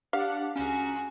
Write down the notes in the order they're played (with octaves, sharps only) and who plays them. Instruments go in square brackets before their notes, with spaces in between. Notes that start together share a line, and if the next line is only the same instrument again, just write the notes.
[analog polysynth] D4 F#5 [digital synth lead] G4 [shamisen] F5
[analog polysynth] C#2 A#5 [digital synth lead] C#4 [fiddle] F#4 G#4